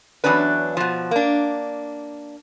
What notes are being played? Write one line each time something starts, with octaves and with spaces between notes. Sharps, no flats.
E2 F#3 C#4 D4 B4
B2 F3
A#3 D4